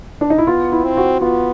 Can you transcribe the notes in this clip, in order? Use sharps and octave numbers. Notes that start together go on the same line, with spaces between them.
D4
D#4
E4
B3 F4
E4
C4
F#4
B3 F4